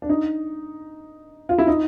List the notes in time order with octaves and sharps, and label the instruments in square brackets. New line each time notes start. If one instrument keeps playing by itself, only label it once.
[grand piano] D4
D#4
F4
E4
D#4